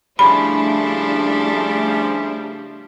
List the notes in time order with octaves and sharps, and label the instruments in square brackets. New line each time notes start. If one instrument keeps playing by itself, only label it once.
[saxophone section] C#3 F3 G3 [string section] A3 D4 E4 [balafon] B5